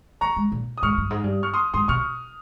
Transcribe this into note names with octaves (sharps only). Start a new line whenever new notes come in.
A#3 A#5 C#6
G#3
A#2
D#6
G#2 C#6 F6
G2
G#2
G2
C#6 F6
C6 D#6
G#2 C6 D#6
C3 C#6 F6